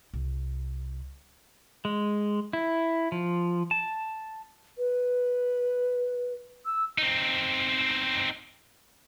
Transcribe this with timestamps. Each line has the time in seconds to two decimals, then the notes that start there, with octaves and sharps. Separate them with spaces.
0.13 C2
1.85 G#3
2.53 E4
3.12 F3
3.71 A5
4.78 B4
6.66 E6
6.98 C4 D#4